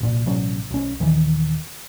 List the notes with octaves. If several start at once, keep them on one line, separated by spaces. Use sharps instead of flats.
C2 A#2
A1 B2 F#3 C#4
B1 C#4
D#1 D#3 E3